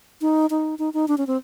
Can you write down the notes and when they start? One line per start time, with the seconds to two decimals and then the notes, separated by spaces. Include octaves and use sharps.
0.21 D#4
0.50 D#4
0.79 D#4
0.94 D#4
1.08 D4
1.18 C#4
1.27 C4